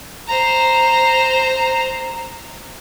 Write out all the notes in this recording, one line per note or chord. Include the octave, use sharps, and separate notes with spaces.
C5 A#5